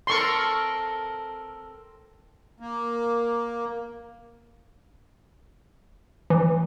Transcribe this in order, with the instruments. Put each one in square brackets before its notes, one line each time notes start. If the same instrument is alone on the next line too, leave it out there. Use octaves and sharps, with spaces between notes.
[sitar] C4 A4 A#4 [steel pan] C6 C#6
[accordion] A#3
[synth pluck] E3